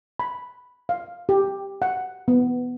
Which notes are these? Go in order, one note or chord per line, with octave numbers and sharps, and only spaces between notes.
B5
F5
G4
F#5
B3